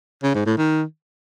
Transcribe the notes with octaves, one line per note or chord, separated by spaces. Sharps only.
C#3
G#2
A2
D#3